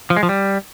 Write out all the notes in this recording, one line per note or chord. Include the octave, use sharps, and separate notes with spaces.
F3
G#3
F3
G3